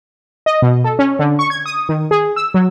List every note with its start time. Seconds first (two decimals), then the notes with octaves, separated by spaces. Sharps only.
0.46 D#5
0.62 B2
0.84 A4
0.99 C#4
1.19 D3
1.39 C#6
1.50 G#6
1.66 D#6
1.89 D#3
2.11 G#4
2.36 E6
2.54 F#3